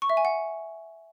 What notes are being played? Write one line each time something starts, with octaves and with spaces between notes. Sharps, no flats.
C#6
E5
G#5
F#5